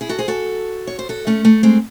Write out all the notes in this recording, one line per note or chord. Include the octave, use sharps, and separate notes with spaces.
E4 G#4
F#4 A4
G#4 C5
F#4 A4
C#5
C5
F#4 A4
A3 C#4
A3
G#3 C4